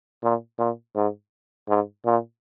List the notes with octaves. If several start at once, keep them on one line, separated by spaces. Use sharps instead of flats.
A#2
A#2
G#2
G#2
A#2